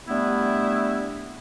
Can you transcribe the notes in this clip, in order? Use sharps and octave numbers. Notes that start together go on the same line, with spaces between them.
G3 A3 B3 D4 E4